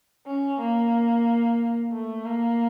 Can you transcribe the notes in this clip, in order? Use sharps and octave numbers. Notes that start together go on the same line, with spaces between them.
C#4
A#3
A3
A#3